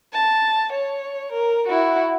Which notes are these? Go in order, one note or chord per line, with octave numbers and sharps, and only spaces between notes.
A5
C#5
A#4
E4 F#4